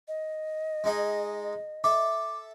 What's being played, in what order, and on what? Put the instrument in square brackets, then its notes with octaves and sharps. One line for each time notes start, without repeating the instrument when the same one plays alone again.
[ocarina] D#5
[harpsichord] G#3 D#4 G#4
[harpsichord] A4 E5 [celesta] D6